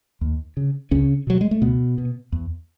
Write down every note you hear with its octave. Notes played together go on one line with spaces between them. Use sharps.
D#2
C#3
C#2 C#3 C#4
B2 F#3
G#3
A3
C#2 B2 B3
B2
E2